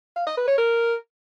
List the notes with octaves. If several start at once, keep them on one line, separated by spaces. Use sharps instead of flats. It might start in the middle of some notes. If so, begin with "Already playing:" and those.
F5
D#5
B4
C#5
A#4